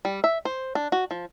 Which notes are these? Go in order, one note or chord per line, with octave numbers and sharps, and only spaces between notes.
G3
E5
C5
D4
F#4
F3